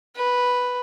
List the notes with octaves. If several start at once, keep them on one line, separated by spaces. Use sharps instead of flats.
B4